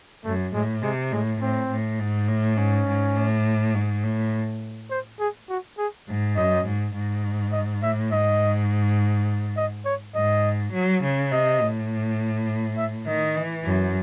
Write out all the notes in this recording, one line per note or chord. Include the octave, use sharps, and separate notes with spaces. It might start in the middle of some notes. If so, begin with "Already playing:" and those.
F#2 A3
A2 G#3
C3 G#3
A2 G#3
A2 C4
A2
G#2
A2
G#2 C#4
G#2
A2
G#2
A2
C5
G#4
F#4
G#4
G#2
F#2 D#5
G#2
G#2
D#5
A2 E5
G#2 D#5
D#5
C#5
G#2 D#5
F#3
C#3
C3 D#5
A2
E5
D#3 D#5
E3
F#2